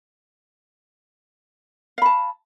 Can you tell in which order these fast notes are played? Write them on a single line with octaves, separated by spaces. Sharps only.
F5 B5 A5